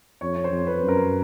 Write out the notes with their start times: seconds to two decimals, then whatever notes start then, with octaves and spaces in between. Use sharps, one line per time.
0.21 F2 C#5
0.35 C#5
0.44 C5
0.52 F2
0.67 B4
0.82 F#2
0.88 A#4